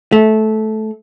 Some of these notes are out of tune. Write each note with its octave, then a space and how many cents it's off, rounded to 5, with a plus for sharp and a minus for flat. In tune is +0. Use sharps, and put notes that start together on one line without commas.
A3 -15